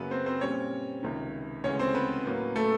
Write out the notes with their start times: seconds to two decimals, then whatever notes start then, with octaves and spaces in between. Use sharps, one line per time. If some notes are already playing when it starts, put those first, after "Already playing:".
Already playing: F#2 C#3 F#3 A#3 B3 B4
0.11 C4 C5
0.26 C4 C5
0.41 A#2 G3 C4 C#4 C#5
1.03 C#2 C3 D#3
1.64 D2 C#3 E3 G#3 C#4 C#5
1.79 C4 C5
1.94 B3 B4
2.25 A2 F#3 A#3 C#4
2.56 A3 A4